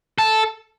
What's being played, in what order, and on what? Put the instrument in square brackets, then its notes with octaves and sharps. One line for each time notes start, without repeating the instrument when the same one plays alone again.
[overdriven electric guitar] A4